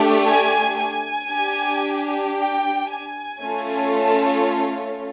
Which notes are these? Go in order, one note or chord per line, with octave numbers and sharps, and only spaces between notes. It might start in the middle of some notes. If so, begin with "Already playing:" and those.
Already playing: A3 D4 G4
G#5
G#5
D4 G4
G5
G#5
A3 C#4 F4 A4
A5